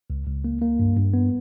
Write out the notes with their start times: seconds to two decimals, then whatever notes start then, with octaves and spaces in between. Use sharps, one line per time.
0.10 C#2
0.27 C#2
0.44 A#3
0.62 A#3
0.79 G2
0.97 G2
1.14 B3